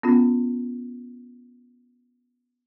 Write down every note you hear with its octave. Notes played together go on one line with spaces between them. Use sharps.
B3 C#4 F4